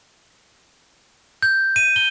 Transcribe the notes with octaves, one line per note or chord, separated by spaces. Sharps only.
G6
D#7
G7